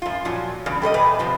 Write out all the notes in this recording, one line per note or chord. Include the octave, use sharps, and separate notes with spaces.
F#2 F4
A#2 F3 F#3
E2 G2 C#3
G3 A4 C#5 D#5
E2 A#2 A3 B4
E2 C3 F3